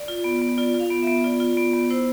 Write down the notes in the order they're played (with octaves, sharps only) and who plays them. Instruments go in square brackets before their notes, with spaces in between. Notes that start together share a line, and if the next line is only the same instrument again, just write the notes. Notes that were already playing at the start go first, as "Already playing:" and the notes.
Already playing: [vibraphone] D5
F4
B3
B3
F4 D5
F4
F5
B3
B3 E5
F4 D5
F4
B3
B3
E4 C5